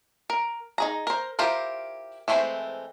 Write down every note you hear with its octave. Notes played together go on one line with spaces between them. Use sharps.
A#4
D#4 G#4 A#5
A#4 C5
E4 F4 G4 A#4 C5
E3 G#3 A3 C4 C5